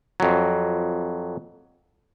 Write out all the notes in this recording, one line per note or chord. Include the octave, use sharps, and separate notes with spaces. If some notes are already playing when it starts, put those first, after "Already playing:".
F2 F#3